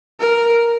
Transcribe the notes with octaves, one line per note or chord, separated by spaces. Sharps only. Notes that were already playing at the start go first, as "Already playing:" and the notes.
A#4